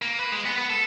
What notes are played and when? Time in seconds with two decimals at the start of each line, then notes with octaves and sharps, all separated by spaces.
0.02 A#3
0.19 B4
0.32 G#3
0.45 B3
0.58 B3
0.70 A4